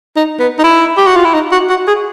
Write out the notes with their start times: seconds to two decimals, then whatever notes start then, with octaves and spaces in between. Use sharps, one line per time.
0.16 D#4
0.40 B3
0.59 D#4
0.64 E4
0.98 G4
1.07 F#4
1.16 F4
1.25 E4
1.34 D#4
1.52 F#4
1.70 F#4
1.88 G#4